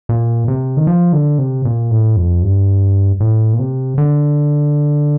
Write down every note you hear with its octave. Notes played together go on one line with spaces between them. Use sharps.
A#2
C3
D#3
F3
D3
C3
A#2
A2
F2
G2
A2
A#2
C3
D3